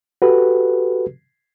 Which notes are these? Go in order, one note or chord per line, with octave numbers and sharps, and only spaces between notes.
F#4 G4 A4 B4